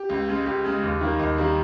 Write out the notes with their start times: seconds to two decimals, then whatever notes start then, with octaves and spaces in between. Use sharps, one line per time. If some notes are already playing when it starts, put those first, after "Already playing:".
Already playing: G4
0.09 C#2
0.28 C#3 G#3
0.46 C#2 G4
0.64 C#3 G#3
0.83 D#2
1.01 D#3 G3 A#3
1.19 D#2 D#5
1.38 D#3 G3 A#3